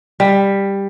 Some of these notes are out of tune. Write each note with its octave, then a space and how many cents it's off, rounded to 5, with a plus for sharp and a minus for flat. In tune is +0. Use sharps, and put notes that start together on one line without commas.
G3 +10